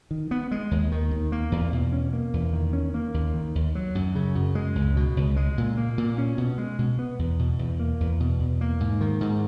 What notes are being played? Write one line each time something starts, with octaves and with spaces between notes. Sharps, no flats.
D#3
B3
G#3
D#2
D#3
D#2
A#3
E2
B2
C#4
A#3
E2
D#3
C#4
A#3
D#2
D#3
D#2
F#3
F#2
C#3
F#2
G#3
C#2
B2
C#2
G#3
A#2
A#3
A#2
C#4
B2
G#3
B2
B3
E2
B2
E2
A#3
E2
B2
E2
A#3
G#2
D#3
G#2